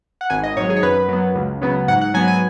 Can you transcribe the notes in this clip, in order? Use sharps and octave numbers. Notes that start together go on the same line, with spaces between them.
F#5
G#1 G#5
D#5
G#2 F#3 C#5
G#4
C#5
F#2 B4
F#3 B3
C#2
C#3 F#3 B3
G#2 F#5
F#5
F#3 B3 G#5
G#5